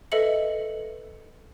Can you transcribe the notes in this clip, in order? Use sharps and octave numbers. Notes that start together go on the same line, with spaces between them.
A4 B4 D#5 E5 C#7 F#7